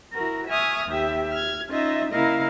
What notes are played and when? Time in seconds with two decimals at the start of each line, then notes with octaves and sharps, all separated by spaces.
0.13 E4 F#4 A#4
0.48 E5 G#5 C#6 D#6 F6
0.87 D#2 G4 E5
1.32 F6 G#6
1.71 C#4 D#4 F4 D#5 E5
2.12 C#3 A#3 E4 A#4 D#5 F5